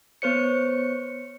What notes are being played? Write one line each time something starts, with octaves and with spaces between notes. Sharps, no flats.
B3 C5 C#5 C#7